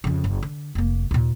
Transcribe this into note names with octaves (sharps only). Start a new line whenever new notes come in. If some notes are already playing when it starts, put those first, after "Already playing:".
F2 C#3
F#1
D3
F1 A#3
D#2 A#2